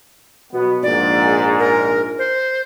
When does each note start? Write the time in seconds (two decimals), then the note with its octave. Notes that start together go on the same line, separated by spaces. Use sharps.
0.53 B2 F#3 B3
0.83 A#1 G#2 D5
1.59 A#4
2.18 C5